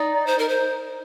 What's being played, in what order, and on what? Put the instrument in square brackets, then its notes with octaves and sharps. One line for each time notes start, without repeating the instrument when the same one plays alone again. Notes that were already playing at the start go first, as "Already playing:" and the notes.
Already playing: [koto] D#4 [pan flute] D5
[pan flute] C5
A#4
C5